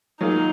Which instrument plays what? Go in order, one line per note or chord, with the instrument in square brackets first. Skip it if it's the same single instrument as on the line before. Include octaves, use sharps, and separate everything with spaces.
[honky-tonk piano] F#3 A#3 F4 G#4 [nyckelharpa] D#4